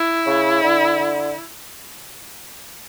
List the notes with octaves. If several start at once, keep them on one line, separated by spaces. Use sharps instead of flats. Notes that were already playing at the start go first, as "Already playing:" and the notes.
Already playing: E4
C#3
D3
D3